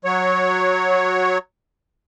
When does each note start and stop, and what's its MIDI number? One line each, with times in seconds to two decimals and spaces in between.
0.05 1.38 54
0.05 1.38 73